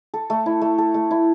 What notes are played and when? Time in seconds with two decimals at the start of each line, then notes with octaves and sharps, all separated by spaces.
0.14 A4
0.30 A3
0.46 E4
0.61 A3
0.78 A4
0.94 A3
1.11 E4